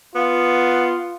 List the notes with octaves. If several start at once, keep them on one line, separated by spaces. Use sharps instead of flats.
B3 F4